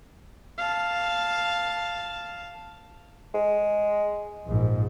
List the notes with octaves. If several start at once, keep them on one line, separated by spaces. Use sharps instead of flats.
F5 A5
G#3
A#1 G#2